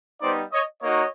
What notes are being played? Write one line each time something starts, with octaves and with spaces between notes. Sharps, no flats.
G3 B3 D#4 C5 D5
C#5 D#5
A#3 D#4 F#4 C#5 D#5